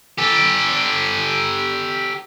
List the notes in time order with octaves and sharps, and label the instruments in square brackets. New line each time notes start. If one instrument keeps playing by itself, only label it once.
[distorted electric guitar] G4 A4